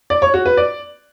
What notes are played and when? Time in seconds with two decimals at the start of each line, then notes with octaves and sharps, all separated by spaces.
0.10 D5
0.22 C#5
0.34 F#4
0.46 B4
0.57 D5